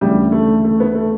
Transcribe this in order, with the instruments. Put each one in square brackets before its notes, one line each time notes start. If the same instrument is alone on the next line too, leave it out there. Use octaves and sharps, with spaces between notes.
[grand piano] D2 C#3 E3 [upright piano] G3
[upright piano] A3
A3
B3
A3